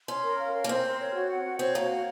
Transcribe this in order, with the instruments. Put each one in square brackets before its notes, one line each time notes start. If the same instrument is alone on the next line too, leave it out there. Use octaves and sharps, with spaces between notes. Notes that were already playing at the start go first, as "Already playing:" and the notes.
[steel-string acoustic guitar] C#4 [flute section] C6
[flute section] A#4
F5
A#4
[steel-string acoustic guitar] A#3
[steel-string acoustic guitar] C4 [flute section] C6
[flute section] A#4
C#5
F#4
F#5
F#4
[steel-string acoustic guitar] C4 [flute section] C#5
[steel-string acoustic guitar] A#3 [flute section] F#4
[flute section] F#5